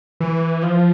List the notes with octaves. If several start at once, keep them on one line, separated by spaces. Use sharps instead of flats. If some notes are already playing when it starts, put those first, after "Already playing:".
E3
F3